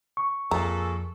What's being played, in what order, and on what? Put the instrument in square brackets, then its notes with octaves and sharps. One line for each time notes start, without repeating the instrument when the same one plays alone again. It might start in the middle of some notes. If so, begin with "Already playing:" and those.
[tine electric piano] C#6
[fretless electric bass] F2 [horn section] A#2 G#4 A4 [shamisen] A#5